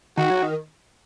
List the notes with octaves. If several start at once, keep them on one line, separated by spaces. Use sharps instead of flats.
D#3 F#4
F#3
D#3